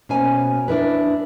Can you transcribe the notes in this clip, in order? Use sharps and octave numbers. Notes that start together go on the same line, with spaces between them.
B2 A#3 C#4 C5 G#5
D4 E4 A#4 B4